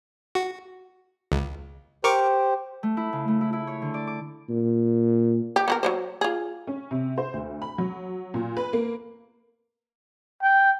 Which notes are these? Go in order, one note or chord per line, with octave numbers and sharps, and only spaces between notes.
F#4
C#2
G4 A#4 C5 C#6 D6
A3
E4
C#3
A3
E4
E4
C#5
D3
D5
D6
A#2
G4
B3 F#4 A#4
F#3 A#3 C5
F4 G#4
C#4
C3
C5
D2
B5
F#3
A#2
B4
A#3
G5